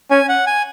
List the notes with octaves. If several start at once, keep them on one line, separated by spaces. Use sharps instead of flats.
C#4 G#5
F#5
G#5